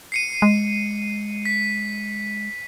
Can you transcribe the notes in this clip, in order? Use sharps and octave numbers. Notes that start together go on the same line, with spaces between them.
C7 C#7 D#7
G#3
B6